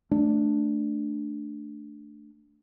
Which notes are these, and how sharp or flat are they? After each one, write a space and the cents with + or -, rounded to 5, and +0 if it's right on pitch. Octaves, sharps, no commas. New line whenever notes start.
A3 +0 D4 +0